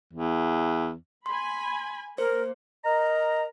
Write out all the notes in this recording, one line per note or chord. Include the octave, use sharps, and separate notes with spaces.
E2
G#5 B5 C6
A#3 A#4 C5
A#4 D#5 A#5